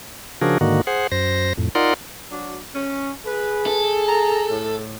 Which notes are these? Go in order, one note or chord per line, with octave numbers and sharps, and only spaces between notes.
C#3 F3 D4 F#4 G#4 A#4
G#2 D3 D#3 A#3 F#4
G#4 C5 F#5
F#2 C5 A#6
F2 A2
D#4 F4 A#4 D5 F#5 C6
F#3 D4 F#4
C#4
G#4 B4
A4
A5 A#5
A2